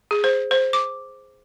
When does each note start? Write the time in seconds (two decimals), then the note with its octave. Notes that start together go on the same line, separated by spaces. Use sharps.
0.11 G#4
0.24 C5
0.51 C5
0.73 D6